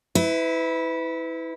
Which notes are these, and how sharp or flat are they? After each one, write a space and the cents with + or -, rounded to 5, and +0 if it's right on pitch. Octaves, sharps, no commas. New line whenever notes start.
E4 -20 B4 +30